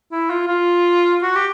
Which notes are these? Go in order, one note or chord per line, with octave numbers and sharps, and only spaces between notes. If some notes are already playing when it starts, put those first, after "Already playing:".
E4
F4
F4
F#4
G4